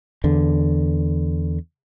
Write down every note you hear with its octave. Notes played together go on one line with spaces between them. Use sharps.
E2 D3